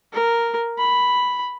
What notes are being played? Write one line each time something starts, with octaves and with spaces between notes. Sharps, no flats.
A#4
B5